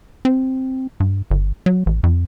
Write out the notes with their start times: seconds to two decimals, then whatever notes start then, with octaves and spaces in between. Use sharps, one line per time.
0.25 C4
1.00 G2
1.30 G1
1.66 F#3
1.86 A1
2.03 F2